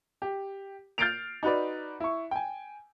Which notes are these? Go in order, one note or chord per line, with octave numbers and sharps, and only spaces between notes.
G4
F6 G6 A6 C7 D7 F7
D#4 F#4 B4 D5
E4 C#6
G5 G#5